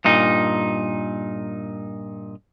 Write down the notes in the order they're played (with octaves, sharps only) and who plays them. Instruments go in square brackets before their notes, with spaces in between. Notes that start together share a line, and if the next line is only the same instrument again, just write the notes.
[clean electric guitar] G2 A#2 D#4